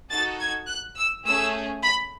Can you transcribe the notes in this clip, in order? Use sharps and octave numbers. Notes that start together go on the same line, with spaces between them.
D#4 F#4 A4 A6
G#6
F#6
E6
A3 C#4 G#4 E6
B5